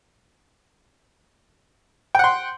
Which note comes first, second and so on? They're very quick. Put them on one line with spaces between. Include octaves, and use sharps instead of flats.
G5 F#5 C6